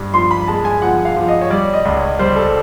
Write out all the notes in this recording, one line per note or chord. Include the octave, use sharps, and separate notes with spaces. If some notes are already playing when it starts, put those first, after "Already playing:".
Already playing: G2
F3 C6
B5
G#3 A5
G#5
F3 F#5
F5
F3
D#5
C#5
G3 D5
D#5
C#2
C#5
G3 C5
A4